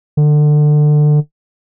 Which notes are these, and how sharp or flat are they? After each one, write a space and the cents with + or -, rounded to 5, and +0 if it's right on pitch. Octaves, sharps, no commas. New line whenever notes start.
D3 +25